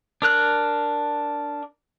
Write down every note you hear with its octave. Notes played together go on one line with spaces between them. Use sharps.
D4 A#4 F#6